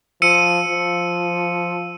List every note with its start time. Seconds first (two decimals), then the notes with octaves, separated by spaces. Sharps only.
0.22 F3 E6 C#7 D#7
0.68 F3